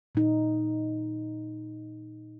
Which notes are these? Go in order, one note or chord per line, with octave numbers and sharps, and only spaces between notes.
A#2 D#4